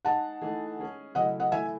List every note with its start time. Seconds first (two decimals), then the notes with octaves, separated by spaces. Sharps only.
0.05 G#3 D#4 G#4 F#5 A5
0.41 E3 A3 D#4 G#4
0.79 G#3 C#4 G#4
1.15 C#3 F#3 A3 E4 D#5 F#5
1.40 D#5 F#5
1.51 E3 A3 E4 E5 G#5